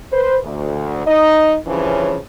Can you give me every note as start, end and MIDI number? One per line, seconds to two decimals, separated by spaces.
0.12 0.38 71
0.12 0.38 72
0.44 1.05 38
1.07 1.57 63
1.07 1.57 75
1.67 2.17 43
1.67 2.17 49
1.67 2.17 52
1.67 2.17 53
1.67 2.17 61